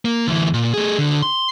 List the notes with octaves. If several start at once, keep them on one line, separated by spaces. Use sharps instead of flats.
A#3
D2 E3
A#2
A3 G#4
D2 D3
C6